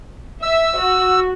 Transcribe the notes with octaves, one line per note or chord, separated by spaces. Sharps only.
E5 E6
F#4